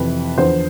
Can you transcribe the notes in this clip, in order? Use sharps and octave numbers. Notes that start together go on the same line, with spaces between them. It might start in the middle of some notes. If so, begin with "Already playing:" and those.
Already playing: F2 C3 E3 B4
E2 D3 F3 C5